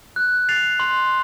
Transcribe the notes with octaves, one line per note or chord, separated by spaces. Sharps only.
F#6
A6 C7 F7
C6